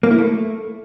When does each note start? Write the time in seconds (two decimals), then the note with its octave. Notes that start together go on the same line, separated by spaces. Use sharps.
0.03 A#3
0.11 E4
0.18 A3